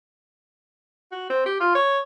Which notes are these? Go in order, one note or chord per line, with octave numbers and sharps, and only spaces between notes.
F#4
C4
G4
F4
C#5